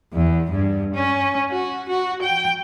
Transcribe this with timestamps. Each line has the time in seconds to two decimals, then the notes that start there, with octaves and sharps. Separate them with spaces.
0.13 E2
0.51 G2
0.95 C#4
1.50 F#4
1.89 F#4
2.22 G5